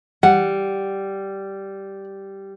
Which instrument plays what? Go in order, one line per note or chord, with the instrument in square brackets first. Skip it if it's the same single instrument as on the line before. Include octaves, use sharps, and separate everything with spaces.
[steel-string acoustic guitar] G3 [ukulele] F#5